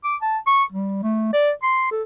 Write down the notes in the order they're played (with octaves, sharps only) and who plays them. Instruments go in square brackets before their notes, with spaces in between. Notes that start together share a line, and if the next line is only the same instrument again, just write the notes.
[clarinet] D6
A5
C#6
G3
A3
D5
C6
A4